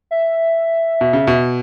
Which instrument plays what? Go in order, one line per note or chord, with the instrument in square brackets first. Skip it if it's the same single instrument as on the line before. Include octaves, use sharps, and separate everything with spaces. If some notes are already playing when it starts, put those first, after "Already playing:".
[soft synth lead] E5
[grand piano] B2
C#3
B2